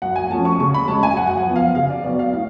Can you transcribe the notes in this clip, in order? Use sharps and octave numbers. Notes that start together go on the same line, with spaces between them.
F#2 F#5
G#5
F3 A3 C#4 A5
C#6
C#3 C#6
B5
G#3 C#4 A5
G#5
F#2 F#5
G#5
F#5
F3 B3
F5
C#3 F5
D5
F#3 B3 D5
F5
A2 F5